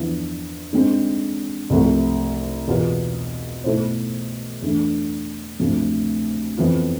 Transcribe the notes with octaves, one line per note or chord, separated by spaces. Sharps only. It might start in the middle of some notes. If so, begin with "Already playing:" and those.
Already playing: E2 D3 F3 B3 E4
D3 G#3 C4
C2 C3 F3 A3
E2 B2 B3 F4 G#4
B2 A3 E4 A4 C5
E2 D3 A3 D4
D2 C3 F3 A3
F2 E3 B3 F4